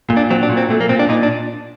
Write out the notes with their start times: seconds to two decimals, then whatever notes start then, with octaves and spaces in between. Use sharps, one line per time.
0.10 A#2
0.17 D4
0.30 F#3 C4
0.43 D4
0.50 A#2
0.57 C4
0.70 A#2 A3
0.81 A#3
0.89 A#2 C4
0.99 D4
1.09 A#2 D#4
1.23 D4